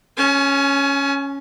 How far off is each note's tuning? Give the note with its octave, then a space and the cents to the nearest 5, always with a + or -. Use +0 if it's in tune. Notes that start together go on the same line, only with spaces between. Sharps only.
C#4 +0 G#5 +35